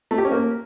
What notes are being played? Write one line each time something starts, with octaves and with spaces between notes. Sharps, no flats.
A3
G4
C#4
A#3